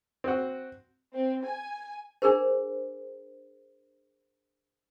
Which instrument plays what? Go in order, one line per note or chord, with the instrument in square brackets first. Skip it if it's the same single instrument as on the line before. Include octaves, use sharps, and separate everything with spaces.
[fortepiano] C4 F#4
[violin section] C4
G#5
[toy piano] D4 G#4 A#4 C5